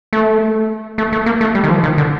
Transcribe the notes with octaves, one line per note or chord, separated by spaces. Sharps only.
A3
A3
A3
A#3
A3
G3
D#3
F3
D#3
D3